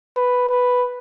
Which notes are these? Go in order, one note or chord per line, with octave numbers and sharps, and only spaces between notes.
B4
B4